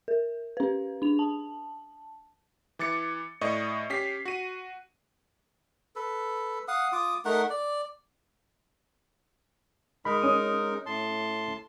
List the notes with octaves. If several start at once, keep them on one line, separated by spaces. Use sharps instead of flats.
A#4
C#4 B4
D4 F7
A5
E3 D6 A6 C#7
A2 D5 D#5 C#6
C#4 G4 B6 C7
F#4 D#7
A4 B4
F5 F#5 D#6
F4 D6 D#6
A3 D#4 A#4 F#5
D5
G#3 D#4 A#4 B5
C#4 D#6
A2 A5 C6